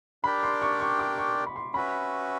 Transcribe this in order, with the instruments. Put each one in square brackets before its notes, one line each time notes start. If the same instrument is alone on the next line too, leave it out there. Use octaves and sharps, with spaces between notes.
[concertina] D4 G4 A#4 D5 G5 [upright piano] B5
[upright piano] C6
C#6
C#6
D6
C#6
B5
C6
[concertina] C#4 F#4 B4 E5 [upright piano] B5